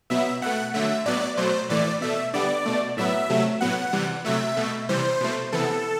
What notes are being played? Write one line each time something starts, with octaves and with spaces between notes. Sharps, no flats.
B2 F#3 B3 E5
B2 A3 F#5
D3 F#3 A3 E5
A2 F#3 B3 D5
B2 F#3 A3 C5
A2 E3 A3 D5
B2 A3 E5
D3 G3 B3 D5
B2 A3
A2 F#3 B3 E5
C3 F#3 A3
A2 F#3 B3 F#5
C3 E3 G3
C3 F#3 A3 E5
B2 A3
C3 E3 G3 C5
B2 A3
C3 E3 B3 A4